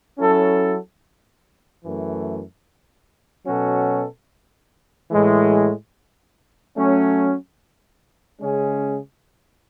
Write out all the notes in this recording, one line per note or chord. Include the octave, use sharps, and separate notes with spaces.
F#3 C#4 E4 A4
F#2 E3 A3
B2 F#3 C#4 F#4 A4
A2 E3 G#3
F#3 A3 C#4
C#3 G#3 C#4 G#4